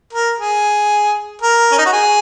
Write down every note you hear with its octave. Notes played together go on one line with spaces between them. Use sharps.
A#4
G#4
A#4
C#4
D#4
F#4
G#4